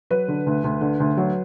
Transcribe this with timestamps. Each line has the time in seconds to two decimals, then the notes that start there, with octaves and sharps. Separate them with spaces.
0.11 F#3 B4
0.28 D3
0.46 D2
0.64 D2
0.81 D3
1.00 D2
1.17 F#3